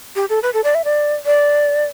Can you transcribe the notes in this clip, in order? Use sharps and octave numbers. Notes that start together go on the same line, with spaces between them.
G4
A4
B4
A4
D5
E5
D5
D5